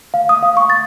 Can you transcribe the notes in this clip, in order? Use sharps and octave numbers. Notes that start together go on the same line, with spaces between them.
F5
D#6
F5
C#6
A6